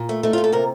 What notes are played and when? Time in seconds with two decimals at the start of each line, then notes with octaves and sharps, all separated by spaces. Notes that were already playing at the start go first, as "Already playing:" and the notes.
Already playing: A#2
0.09 A3
0.23 A3 D#4
0.33 F4
0.38 A#2
0.44 A4
0.52 C3 A#4